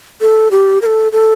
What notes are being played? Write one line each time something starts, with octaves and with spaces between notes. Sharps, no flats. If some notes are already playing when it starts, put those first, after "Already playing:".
A4
G4
A#4
A4
A4